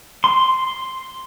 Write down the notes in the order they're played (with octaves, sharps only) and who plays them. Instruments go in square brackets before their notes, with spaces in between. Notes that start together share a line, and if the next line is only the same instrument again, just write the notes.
[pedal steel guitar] C6